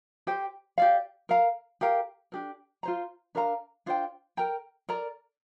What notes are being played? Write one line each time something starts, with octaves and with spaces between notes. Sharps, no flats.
G4 C5 G5
G4 D5 F5
A#4 F5 A#5
G4 A#4 F5 A#5
D4 G4 A#4
F4 C5 A#5
D4 A#4 F5 A#5
D4 F4 C5 G5
A#4 G5 A#5
A#4 D5 A#5